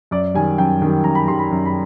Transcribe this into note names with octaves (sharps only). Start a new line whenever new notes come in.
F#2 D5
D#3 G3 G#5
F#2 G5
D#3 G3
F#2 A#5
B5
D#3 G3 C6
B5
F#2
B5